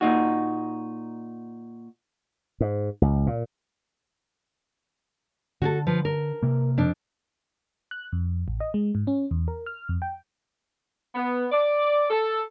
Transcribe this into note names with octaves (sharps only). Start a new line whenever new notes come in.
A#2 D#4 F#4
G#2
C#2
A#2
D3 F#4 G#4 A4
F3 B4
A#4
C3 A#3
F2 D4
F#6
F2
A1
D#5
G#3
G#2
C#4
E2
A#4
F6
F2
G5
B3
D5
A4